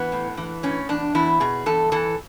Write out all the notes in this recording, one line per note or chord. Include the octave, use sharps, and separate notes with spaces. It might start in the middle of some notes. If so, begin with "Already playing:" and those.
Already playing: E3 B3
A2
E3
A2 C#4
E2 D4
E2 E4
B2 G#4
E2 A4
E3 A4